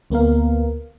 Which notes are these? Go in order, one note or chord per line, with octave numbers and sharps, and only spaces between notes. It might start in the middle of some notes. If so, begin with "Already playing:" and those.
D2 A#3 B3 A#4 F5